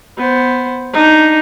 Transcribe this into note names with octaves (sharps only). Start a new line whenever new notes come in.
B3 C5
D4 D#4